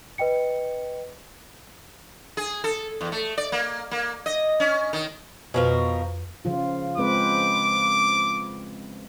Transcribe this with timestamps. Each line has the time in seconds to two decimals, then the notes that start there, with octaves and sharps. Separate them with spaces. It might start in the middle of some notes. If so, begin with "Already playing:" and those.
0.18 B4 D#5 G5 C#7
2.37 G#4
2.64 A4
3.01 E2
3.12 A3
3.38 D5
3.52 A#3
3.91 A#3
4.26 D#5
4.60 C#4
4.93 D#3
5.54 F2 B2 F3 A#4 B4
6.45 C#3 F3 F4
6.98 G#3 C4 B4 D6